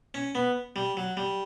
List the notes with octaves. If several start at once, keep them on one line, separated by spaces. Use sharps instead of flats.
C#4
B3
G3
F#3
G3